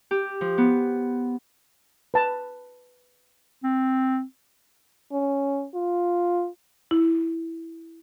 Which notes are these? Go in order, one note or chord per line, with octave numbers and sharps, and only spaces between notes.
G4
F3
B3
B4 A5
C4
C#4
F4
E4